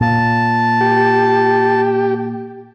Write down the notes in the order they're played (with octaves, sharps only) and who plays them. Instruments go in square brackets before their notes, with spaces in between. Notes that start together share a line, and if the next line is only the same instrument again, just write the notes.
[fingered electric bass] A#2 [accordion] A5
[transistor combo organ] G4